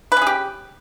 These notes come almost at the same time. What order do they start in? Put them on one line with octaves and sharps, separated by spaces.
B4 C#4 G#4 G4